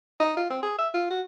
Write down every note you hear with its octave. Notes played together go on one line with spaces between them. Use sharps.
D#4
F4
C4
G#4
E5
F4
F#4